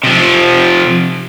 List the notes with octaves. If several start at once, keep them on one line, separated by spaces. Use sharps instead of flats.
C3 F3